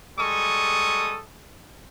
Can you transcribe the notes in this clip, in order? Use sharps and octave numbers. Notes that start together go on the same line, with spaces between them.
G3 G#3 A4 C#6 D#6